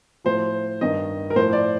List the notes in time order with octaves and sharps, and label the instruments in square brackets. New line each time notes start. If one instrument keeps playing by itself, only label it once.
[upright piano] A2 F3 C5
G2 D#3 D#5
A#4
A2 F3 C5
D5